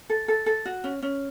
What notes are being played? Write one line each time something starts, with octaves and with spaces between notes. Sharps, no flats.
A4
A4
A4
F#4
C#4
C#4